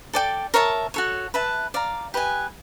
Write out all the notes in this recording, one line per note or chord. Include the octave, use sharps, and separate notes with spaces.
A4 D5 G5
A#4 C#5 E5 A5
F#4 A4 C#5
B4 E5 A5
D5 F5 A#5
G4 B4 D#5 G#5